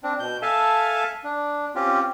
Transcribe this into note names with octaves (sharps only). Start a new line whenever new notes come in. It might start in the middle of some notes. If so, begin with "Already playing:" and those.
C4 D4
B2 G6
A4 E5 F5 G#5 A5
D4
C4 C#4 F4 G4